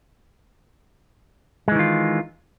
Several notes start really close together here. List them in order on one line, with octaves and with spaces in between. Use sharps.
G#3 E3 D#3 F4